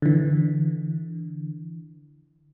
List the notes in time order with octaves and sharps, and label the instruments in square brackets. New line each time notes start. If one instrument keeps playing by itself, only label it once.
[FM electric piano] D3 E3